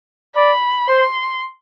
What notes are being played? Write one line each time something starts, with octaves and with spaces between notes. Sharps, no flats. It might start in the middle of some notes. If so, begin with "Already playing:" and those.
D5 B5
C5 C6